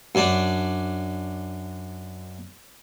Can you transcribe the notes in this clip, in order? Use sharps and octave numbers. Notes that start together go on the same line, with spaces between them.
F#2 D4